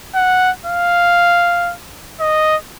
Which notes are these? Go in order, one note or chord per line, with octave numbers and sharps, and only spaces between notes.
F#5
F5
D#5